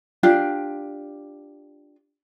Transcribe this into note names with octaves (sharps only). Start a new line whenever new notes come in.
D4 F4 G4